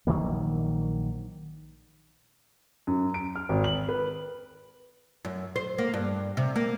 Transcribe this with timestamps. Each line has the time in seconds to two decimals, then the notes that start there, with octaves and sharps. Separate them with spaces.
0.07 A#1 D#3 F#3 A#3
2.87 F#2
3.14 D7
3.36 F6
3.49 G#1
3.64 F#7
3.89 B4
5.25 F#2
5.56 C5
5.78 A#3
5.94 G2
6.37 C3
6.56 A#3